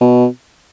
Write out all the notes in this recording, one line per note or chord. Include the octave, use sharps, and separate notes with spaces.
B2